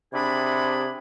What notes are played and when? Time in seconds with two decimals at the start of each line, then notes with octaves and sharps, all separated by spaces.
0.13 C3 D4 G#4 B5